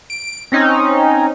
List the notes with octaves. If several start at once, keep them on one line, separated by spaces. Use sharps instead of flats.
D7
C4 C#4 D#4